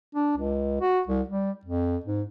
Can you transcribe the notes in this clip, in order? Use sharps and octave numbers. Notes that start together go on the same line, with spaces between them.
D4
C#2
F#4
C2
G3
F2
G#2